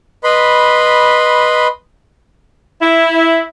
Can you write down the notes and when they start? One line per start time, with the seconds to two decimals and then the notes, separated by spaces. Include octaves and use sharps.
0.24 B4 D#5 B5 C6
2.81 E4